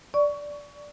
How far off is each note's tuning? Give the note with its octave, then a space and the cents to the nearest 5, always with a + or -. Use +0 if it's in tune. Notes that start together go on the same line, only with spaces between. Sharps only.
D5 -10 C#6 +20